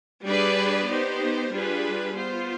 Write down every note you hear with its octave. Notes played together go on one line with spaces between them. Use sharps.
G3 D4 G#4 B4 D5
B3 D#4 G4 C5
G3 D4 F4 G#4 B4
B3 F4 C5